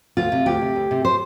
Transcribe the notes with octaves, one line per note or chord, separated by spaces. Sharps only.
D2 F4
C3
D2 G4
C3
D2
C3
C5